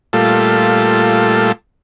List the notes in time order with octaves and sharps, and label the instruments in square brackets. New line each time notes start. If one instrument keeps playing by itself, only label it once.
[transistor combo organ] A#2 G3 A3 F4 A4